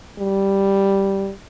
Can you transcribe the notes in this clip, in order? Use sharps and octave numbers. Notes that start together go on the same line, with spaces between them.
G3